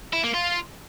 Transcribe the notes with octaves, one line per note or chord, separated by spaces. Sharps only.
E4
A#3
F4